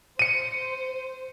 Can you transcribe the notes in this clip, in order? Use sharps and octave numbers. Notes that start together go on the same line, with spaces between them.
C5 C#7 D#7